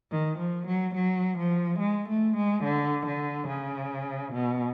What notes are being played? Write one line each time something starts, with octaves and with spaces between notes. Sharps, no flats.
D#3
F3
F#3
F#3
F3
G#3
A3
G#3
D3
D3
C#3
B2